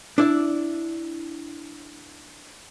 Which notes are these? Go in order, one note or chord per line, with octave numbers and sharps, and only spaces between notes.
D4 E4 D5